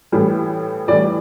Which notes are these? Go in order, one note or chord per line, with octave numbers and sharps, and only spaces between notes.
A2 E3 G3
A2 E3 G3 D5